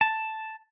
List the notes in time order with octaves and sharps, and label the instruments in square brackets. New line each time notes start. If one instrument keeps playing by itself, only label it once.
[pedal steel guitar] A5